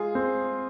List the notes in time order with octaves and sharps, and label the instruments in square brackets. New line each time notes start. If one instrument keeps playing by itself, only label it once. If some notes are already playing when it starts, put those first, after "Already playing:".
Already playing: [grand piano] G#3 [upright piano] F4 G#4
[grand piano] C4